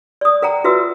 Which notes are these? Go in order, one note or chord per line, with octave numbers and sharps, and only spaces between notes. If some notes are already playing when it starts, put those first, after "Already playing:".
D5 D#6
A#4 F#5 G5 A#5
F4 F#4 B4 E5 E6